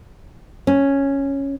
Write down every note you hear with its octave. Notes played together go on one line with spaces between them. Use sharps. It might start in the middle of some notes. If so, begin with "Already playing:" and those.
C#4